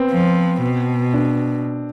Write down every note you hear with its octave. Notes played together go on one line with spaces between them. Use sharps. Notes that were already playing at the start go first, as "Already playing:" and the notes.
Already playing: B3 C4
F3
B2
D4